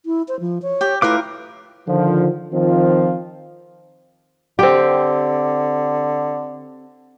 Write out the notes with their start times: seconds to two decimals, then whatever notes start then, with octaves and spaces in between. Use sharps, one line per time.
0.06 E4
0.28 C5
0.40 F3
0.62 C#5
0.81 G4
1.02 A3 E4 F4 A#4 B4 D6
1.88 D3 D#3 F3
2.53 D#3 F3 C4 F4
4.59 D3 C4 G4